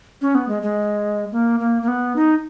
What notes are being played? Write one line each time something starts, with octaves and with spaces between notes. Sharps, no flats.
C#4
B3
G#3
G#3
A#3
A#3
A#3
B3
D#4